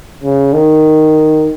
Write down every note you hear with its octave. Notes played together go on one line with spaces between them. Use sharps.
C#3
D#3